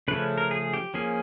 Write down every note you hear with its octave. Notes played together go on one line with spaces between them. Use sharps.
C#3 F3 A3 C#4 B4
A#4
G#4
G4
F3 A#3 C#4 G#4